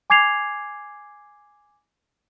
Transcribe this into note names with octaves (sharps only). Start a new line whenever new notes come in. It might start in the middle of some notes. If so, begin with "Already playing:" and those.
G#5 D6 G#6 C7 F7